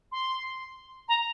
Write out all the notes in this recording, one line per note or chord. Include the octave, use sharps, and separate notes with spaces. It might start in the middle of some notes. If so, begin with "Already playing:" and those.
C6
A#5